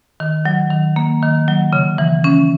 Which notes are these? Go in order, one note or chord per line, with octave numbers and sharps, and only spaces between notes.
D#3
F#3
D#3
A#3
D#3
F#3
C#3
E3
C#4